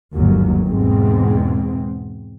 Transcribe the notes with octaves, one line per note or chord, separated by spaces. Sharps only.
G1 D#2 G#2 F#3
E2 G#2 B2 G#3 C4